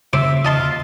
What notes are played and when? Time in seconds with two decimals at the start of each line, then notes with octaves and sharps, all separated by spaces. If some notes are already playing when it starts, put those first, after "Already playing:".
0.13 C#3 C5 E5 D6
0.45 F4 D#5 A5 C6